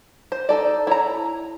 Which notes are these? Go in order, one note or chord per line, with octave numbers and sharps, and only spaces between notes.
C5
D#4 A4 D5
E4 C#5 A#5